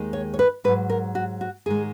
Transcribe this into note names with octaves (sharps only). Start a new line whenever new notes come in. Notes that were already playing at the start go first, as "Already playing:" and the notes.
Already playing: D#2 D#3 G#3
C#5
C#5
B4
G#2 F#3 B4
A#4
F#4
F#4
G#2 D#3 G#3 G#4